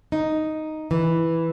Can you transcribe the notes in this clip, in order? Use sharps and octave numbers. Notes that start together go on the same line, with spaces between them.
D#4
E3